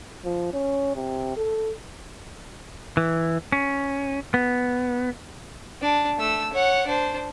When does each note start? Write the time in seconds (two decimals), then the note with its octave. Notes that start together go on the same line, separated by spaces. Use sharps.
0.25 F3
0.53 C#4
0.95 C3
1.37 A4
2.97 E3
3.52 C#4
4.34 B3
5.82 D4
6.19 A3 E6
6.53 C#5 F#5
6.87 D4 C5